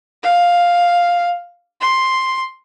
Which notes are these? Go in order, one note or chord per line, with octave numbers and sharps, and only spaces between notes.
F5
C6